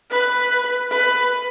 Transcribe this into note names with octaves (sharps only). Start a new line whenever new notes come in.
B4
B4